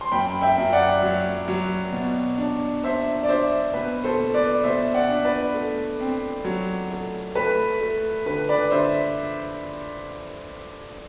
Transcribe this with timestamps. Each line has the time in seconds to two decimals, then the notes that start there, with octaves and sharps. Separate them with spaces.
0.01 C6
0.12 F#2 G5 B5
0.42 E5 G5
0.58 F#2
0.72 D5 F#5
1.02 F#3
1.48 F#3
1.92 B2
2.38 D4
2.84 D4 C5 E5
3.23 D5
3.29 D4 C5 E5
3.74 B2 B4
4.04 A4 C5
4.19 B2
4.34 B4 D5
4.64 B2 C5 E5
4.94 D5 F#5
5.09 D4
5.25 B4 D5
5.54 A3
6.00 C4
6.45 F#3
6.91 A3
7.35 A3 B4
7.81 A3
8.26 D3 B4
8.49 B4 D5
8.71 D3 C5 E5